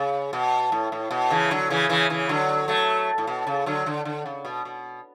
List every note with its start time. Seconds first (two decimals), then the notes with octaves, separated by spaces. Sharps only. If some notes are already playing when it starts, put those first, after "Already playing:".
Already playing: C#3
0.33 B2
0.72 A2
0.92 A2
1.11 B2
1.30 C#3 E3
1.50 D3 F#3
1.70 C#3 E3
1.89 C#3 E3
2.10 C#3 E3
2.29 D3 F#3
2.68 F#3 A3
3.18 A2
3.27 B2
3.47 C#3
3.66 D3 F#3
3.86 D3
4.05 D3
4.26 C#3
4.45 B2
4.65 B2